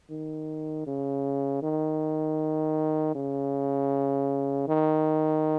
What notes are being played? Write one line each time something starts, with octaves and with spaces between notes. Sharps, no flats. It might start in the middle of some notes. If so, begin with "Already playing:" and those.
D#3
C#3
D#3
C#3
D#3